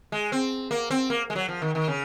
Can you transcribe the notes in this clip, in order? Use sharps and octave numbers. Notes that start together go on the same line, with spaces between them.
G#3
C4
A#3
C4
A#3
G#3
F#3
F3
D#3
D#3
C#3